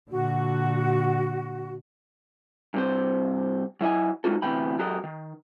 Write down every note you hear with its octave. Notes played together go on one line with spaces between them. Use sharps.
A#2 D3 F#4
G2 C3 C5
F#3 E4 D#5 G#5
G#3 D#4 F4 F#4 A4
D2 C3 E3 B3 G5 B5
F#3 F#4 G4 A4 A#4 D#5
D#3